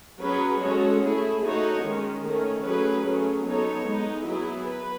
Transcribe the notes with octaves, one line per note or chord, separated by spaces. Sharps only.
F#3 C#4 G#4 B4
G#3 C#4 F#4 A4 C#5
A3 E4 G#4
A3 D#4 F#4 C#5
D#3 G#3 C#4
D#3 A3 C#4
F#3 A3 C#4 G#4 B4
F#3 A3 C#4 G#4
F#3 B3 D#4 A4 C#5
G#3 B3 D#4
F#3 B3 E4 G#4
B4